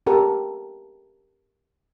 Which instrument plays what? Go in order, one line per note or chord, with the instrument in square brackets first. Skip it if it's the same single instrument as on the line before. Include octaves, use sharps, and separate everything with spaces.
[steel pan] C#4 G4 A4 A#4 F#5